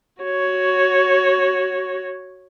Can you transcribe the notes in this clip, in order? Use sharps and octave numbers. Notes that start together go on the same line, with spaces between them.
F#4 C#5